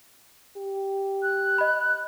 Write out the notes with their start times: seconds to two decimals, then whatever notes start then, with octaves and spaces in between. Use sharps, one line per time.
0.57 G4
1.23 F#6
1.58 D#5 B5